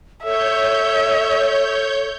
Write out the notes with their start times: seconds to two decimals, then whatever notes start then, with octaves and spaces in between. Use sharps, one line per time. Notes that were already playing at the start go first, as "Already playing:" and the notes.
0.24 A4 C#5 E5 G6